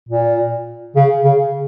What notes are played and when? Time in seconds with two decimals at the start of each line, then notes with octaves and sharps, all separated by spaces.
0.09 A#2
0.96 C#3
1.24 C#3